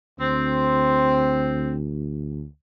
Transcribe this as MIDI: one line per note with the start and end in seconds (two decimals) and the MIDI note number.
0.20 2.46 38
0.20 1.73 60